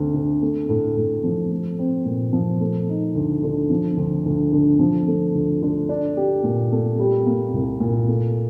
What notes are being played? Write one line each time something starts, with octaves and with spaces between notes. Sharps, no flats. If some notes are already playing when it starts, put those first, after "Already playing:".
Already playing: D2 C4
D3
A3
A2
A2
F3
A3
C4
A#2
F3
A3
D#4
D2
D3
F3
D2
D2
D3
F3
A3
D2
D3
D4
G4
A#2
A3
G3
A#3
C2
A#2
A3